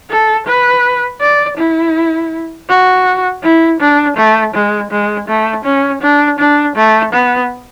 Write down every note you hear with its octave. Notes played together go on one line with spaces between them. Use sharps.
A4
B4
D5
E4
F#4
E4
D4
A3
G#3
G#3
A3
C#4
D4
D4
A3
B3